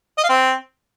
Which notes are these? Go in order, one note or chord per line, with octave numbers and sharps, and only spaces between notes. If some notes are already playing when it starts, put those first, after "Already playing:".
D#5
F5
C4